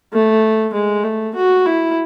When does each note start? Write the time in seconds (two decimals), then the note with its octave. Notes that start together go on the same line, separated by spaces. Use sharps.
0.13 A3
0.74 G#3
1.04 A3
1.35 F#4
1.66 E4